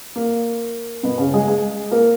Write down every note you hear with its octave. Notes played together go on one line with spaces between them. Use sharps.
A#3
B2 B3
C#3 C#4
G#3 G#4
G#3 G#4
A#3 A#4